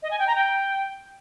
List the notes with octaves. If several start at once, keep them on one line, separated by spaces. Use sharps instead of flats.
D#5
G#5
G5
A#5
G5